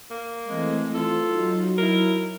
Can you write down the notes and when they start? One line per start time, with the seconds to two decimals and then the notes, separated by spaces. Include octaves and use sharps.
0.11 A#3
0.47 E3 G#3 A3 C4
0.94 F4 A4
1.27 F#3 D#4
1.78 E4 A#4